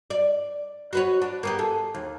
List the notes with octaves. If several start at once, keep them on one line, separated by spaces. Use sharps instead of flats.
D5
F#4 B4 C#5
D4
A#3 B3 G4
G#4 A4
D#2